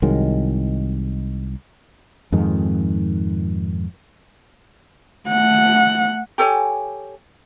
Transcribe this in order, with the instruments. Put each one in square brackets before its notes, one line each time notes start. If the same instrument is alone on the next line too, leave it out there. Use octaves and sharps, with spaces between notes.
[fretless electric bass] C2 D#3 F#3 G#3
F2 G#2 D#3 G#3
[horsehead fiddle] A3 F#5
[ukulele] G4 A4 C#5 G#5